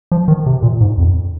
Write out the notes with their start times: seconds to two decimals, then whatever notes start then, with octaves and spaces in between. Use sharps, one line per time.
0.12 F3
0.28 D#3
0.46 C3
0.63 A#2
0.81 G#2
0.98 F2